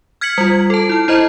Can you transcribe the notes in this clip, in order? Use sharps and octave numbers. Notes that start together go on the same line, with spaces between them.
F6 G#6 B6 C#7 F#7
G3 F4
A4 A5
E4 F6
E4 C5 D#5 A#5